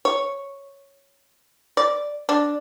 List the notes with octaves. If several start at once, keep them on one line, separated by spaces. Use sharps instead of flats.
C#5
D5
D4